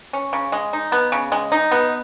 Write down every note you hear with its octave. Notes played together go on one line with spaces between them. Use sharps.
C#4
C#3
G#3
D#4
B3
C#3
G#3
D#4
B3